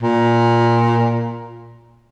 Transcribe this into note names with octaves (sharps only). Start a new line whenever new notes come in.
A#2